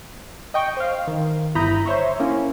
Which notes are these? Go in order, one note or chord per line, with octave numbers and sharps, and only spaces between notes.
D#5 G5 C#6
C5 F5
D#3
G1 E4 A#5 B5 D#6 G6
C5 C#5 E5 C#6
A#3 C#4 E4